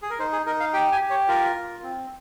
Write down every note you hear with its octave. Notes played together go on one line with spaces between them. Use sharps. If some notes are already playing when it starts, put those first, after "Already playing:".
G#4
A#4
D#4 C5
G#4
D#4 A#4
F5
G4 G5
G#5
G4
C#5
F4 A#4
F4
C4